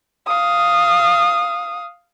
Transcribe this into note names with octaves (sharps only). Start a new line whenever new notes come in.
F5 D#6